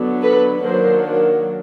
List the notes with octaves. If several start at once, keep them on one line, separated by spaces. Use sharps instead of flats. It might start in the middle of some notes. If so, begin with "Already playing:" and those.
Already playing: D3 F#3 B3 D4
A4 B4
D#3 F#3 A#3 D4 A#4 C5